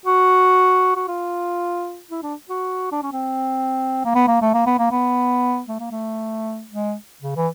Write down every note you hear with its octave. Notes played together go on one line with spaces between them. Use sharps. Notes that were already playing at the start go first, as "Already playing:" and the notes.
F#4
F#4
F4
E4
D4
F#4
D4
C#4
C4
A#3
B3
A#3
A3
A#3
B3
A#3
B3
A3
A#3
A3
G#3
C#3
E3